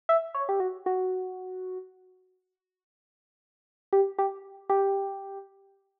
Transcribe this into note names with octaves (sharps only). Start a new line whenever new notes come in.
E5
C#5
G4
F#4
F#4
G4
G4
G4